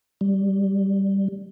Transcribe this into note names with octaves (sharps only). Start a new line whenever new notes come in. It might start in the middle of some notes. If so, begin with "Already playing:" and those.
G3